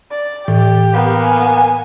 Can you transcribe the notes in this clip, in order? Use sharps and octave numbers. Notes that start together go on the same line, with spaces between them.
D5
A2 E3 G4
A#3 B3
G#5